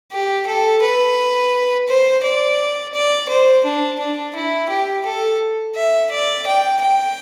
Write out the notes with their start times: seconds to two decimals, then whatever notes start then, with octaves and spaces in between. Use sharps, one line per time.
0.12 G4
0.47 A4
0.82 B4
1.88 C5
2.24 D5
2.94 D5
3.29 C5
3.64 D4
3.99 D4
4.35 E4
4.70 G4
5.05 A4
5.75 E5
6.11 D5
6.46 G5
6.81 G5